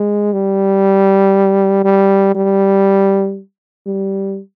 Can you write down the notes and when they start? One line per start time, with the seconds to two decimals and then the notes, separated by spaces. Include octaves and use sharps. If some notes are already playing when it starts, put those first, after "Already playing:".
Already playing: G#3
0.33 G3
1.84 G3
2.35 G3
3.86 G3